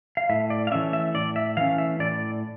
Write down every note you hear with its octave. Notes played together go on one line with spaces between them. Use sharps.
F5
A2 E5
D5
F5
E3 A3 C#4 E5
E5
A2 D5
E5
E3 A3 C#4 F5
E5
A2 D5